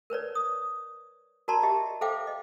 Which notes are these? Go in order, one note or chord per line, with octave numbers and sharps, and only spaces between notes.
A#4 B4 C#5 D5
D#6
F#4 A#4 D5 A5 A#5 C6
F#4 G4 D#5 E5
A4 C5 E5 F5 G5 D6
D#5